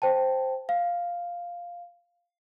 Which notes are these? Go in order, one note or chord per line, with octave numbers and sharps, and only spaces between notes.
C5 G5 A5
F5